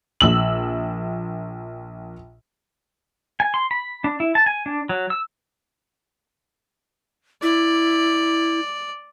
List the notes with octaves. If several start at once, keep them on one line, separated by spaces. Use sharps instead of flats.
A#1 E6 F#7
G#5
C6
B5
D4
E4
A5
G#5
D4
F#3
E6
E4 D5